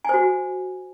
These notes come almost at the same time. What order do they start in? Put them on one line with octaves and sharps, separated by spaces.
G#5 C5 F#4